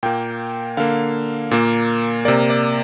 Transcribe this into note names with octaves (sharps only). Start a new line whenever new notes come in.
A#2 A#3 G5
D3 A#3 F5
A#2 A#3
C3 A#3 D5
D5